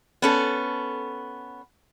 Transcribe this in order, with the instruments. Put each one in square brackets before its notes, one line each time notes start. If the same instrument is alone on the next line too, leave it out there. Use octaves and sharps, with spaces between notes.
[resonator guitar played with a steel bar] B3 C#4 A4